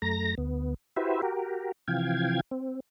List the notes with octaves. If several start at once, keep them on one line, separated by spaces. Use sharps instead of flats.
F#2 A3 A#5 A#6
D2 B3
E4 F#4 G4 B4 C5 E5
F#4 G4 A#4
C3 E3 F3 F5 G5 G#6
C4